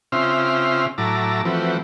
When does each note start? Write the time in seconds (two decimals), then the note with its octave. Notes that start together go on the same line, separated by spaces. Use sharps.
0.12 C#3 C4 F4 E5 C6 F6
0.98 A2 F#3 E4 A5 A#5 D6
1.45 E3 F3 A3 C4 F#4 B4